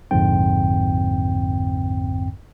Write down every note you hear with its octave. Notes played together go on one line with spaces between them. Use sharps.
A#1 F2 G#2 D3 C4 G5